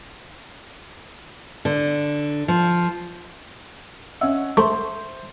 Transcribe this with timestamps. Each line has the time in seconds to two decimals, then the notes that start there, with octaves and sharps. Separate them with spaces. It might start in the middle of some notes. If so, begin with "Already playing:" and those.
1.65 D3
2.48 F3
4.21 C#4 D#5 E5 F#5 E6
4.57 A3 C5 E5 C6